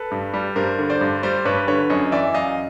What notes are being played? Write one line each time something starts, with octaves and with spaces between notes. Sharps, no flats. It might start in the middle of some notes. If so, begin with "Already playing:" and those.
Already playing: A4 B4
G2
G3
G2 A#4 C5
D3
C5 D5
G2
G3 C5 D5
G2 B4 C#5
D3 B4 C#5
F#2 C#5 D#5
E3 D5 E5
F#2 D#5 F5